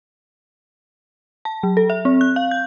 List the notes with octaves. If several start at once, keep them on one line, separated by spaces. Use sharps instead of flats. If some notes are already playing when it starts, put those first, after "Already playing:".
A5
F#3
A4
E5
C4
F#6
F5
G6